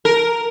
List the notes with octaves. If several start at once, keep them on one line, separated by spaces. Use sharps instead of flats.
A#4